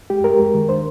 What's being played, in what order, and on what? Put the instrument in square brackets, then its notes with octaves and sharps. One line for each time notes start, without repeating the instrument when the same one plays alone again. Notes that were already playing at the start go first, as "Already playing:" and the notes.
[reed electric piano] G#3 G4
G#3 A#4
G#3
D#3
D4 C5